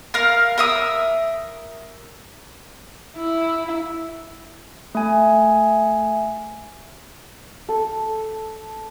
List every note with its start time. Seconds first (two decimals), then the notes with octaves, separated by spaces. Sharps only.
0.14 A#4 F5
0.58 A#4 E5 D#6
3.16 E4
4.95 A3 G#5
7.69 A4